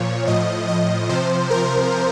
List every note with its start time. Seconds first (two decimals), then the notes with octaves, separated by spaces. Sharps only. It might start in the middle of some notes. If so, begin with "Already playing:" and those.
Already playing: A#2 F3 C#5
0.27 A2 F3 D#5
0.68 D#5
1.09 C3 F3 C5
1.50 A#4